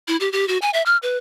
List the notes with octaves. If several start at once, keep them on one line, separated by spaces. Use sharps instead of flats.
E4
G4
G4
F#4
G#5
E5
F6
B4